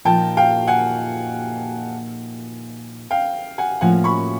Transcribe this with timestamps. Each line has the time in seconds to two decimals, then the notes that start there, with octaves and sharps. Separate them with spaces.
0.05 A#2 F3 A#3 D#4 G5 A5
0.37 F5 G5
0.67 F#5 G#5
3.11 F5 G5
3.58 F#5 G#5
3.81 A2 F3 A#3 C#4 F#5 G#5
4.04 B5 C#6